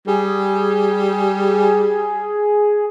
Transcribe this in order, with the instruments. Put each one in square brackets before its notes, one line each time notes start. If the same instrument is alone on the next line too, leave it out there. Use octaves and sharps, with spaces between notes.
[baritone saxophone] G3 [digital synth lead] G#4